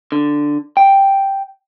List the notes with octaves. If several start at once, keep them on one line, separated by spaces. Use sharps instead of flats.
D3
G5